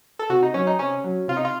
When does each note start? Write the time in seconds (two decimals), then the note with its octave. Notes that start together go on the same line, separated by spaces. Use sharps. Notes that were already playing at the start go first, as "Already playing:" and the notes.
0.19 A4
0.29 C3 F#4
0.43 D#4
0.54 F#3 C#4
0.67 D#4
0.79 C3 C#4
1.04 F#3
1.28 C3 F4
1.37 D#4
1.45 F4